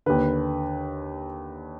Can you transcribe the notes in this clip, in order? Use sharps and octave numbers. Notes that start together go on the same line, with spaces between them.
D#2 D3 B4